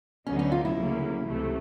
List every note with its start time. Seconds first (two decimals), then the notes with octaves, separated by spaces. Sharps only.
0.27 D2 D3 F#3 B3 C#4 D#4
0.39 C#4
0.52 F4
0.65 E4
0.78 D2 C#3 F#3 A#3
1.28 C#2 C3 E3 A3